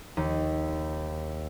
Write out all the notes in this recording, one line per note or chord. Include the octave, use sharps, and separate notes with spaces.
D#2